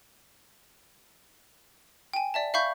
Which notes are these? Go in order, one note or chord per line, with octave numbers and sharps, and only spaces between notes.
G5 G#5
D5 E5 A5
E5 F5 B5 C#6 G6